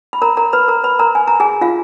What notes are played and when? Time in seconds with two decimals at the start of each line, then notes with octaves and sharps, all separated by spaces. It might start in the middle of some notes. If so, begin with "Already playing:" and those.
0.13 B5
0.22 A#4 A#5
0.37 A#4 A#5
0.53 B4 B5
0.68 A#4 A#5
0.84 B4 B5
0.99 A#4 A#5
1.15 G#5
1.27 A#5
1.40 G#4 G#5
1.61 F4 F5